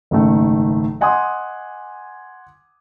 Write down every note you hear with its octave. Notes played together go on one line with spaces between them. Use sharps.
F#1 G#2 D#3 A3
D#5 F#5 G#5 C6 D6 D#6